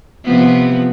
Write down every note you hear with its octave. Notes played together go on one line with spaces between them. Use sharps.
C3 F3 B3